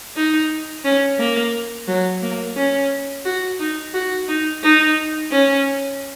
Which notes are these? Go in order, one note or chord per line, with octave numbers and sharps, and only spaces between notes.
D#4
C#4
A#3
F#3
A#3
C#4
F#4
D#4
F#4
D#4
D#4
C#4